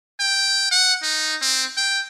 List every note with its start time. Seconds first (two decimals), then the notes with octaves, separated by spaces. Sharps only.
0.20 G5
0.71 F#5
1.03 D#4
1.42 C4
1.77 G5